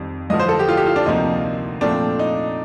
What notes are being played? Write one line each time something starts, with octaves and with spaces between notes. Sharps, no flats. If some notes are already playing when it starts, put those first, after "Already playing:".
Already playing: F2 D#3 G3 C4
G2 D3 F3 D#5
C5
A4
G4
F4
G4
F4
D4
D2 C3 F3 A#3 D#4
A#2 F3 A3 C4 D4
D#4